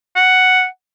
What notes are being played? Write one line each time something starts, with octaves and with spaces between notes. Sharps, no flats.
F#5